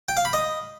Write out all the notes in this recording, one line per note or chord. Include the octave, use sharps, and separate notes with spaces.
G5
F5
B5
D#5